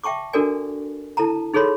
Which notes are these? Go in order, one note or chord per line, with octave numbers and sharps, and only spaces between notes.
E5 G5 A5 C#6 D6
D4 F#4 A4 A#4 D5 G#5
E4 A4 A5 A#5
D#4 G#4 A4 C#5 B5 C6